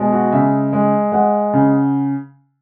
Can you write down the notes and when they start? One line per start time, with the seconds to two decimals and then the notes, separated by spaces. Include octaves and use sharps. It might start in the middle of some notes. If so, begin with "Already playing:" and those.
Already playing: B2 G#3
0.12 F#4
0.32 C#3 E5
0.73 G#3
1.12 G#3 F#5
1.53 C#3